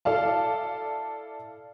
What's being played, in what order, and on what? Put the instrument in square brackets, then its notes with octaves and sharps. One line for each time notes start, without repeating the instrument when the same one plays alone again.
[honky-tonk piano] E4 A4 D5 F5 A5